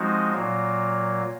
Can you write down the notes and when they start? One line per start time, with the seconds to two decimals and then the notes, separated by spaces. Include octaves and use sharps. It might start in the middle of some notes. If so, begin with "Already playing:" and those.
Already playing: F3 G#3 C4 D#4 F#4
0.33 A#2 F#3 A#3